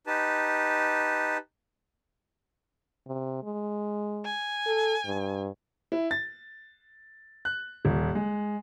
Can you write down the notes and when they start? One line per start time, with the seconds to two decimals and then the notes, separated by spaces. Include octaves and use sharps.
0.07 D#4 G4 B4 A5
3.07 C3
3.43 G#3
4.25 G#5
4.67 A4
5.06 G2
5.92 E4
6.11 A6
7.45 F#6
7.85 D#1
8.15 G#3